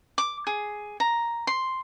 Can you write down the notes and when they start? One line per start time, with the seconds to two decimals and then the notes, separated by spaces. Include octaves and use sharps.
0.18 D6
0.47 G#4
1.00 A#5
1.47 C6